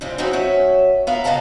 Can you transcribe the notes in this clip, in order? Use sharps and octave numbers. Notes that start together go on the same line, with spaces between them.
G#2 C3 F3 G3 C4
C4 C#4 D#4 E4 F#4 G#4
F#3 C#4 E5
B3 A#4 E5 F5
G#2 C#3 B3 D#5 A5 A#5